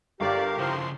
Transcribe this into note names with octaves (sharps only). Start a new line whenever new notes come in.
G1 G4 A#4 D5 F5
C#3 F3 E4 C6